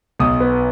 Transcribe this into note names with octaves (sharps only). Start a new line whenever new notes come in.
B1 D#6
B3